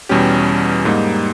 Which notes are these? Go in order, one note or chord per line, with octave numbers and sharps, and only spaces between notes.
E2 B2 G3 C#4 G4
G#2 G3 A#3 D#4